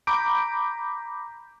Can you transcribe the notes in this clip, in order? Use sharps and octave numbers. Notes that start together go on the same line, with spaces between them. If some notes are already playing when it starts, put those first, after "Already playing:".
A#5 B5 D6 G6 D7